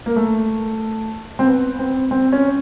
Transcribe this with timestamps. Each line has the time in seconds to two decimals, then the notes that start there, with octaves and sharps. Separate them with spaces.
0.06 A#3
0.16 A3
1.39 C4
1.47 B3
1.79 C4
2.11 C4
2.32 C#4